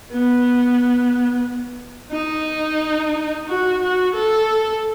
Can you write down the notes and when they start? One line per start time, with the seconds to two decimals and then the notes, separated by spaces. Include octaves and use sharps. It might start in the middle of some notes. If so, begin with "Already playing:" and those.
0.10 B3
2.12 D#4
3.47 F#4
3.81 F#4
4.14 A4